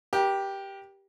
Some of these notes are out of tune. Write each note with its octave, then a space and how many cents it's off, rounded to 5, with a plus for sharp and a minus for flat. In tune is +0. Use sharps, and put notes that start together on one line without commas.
G4 +0 A#4 +45